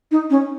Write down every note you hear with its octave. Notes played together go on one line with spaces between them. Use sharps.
D#4
C#4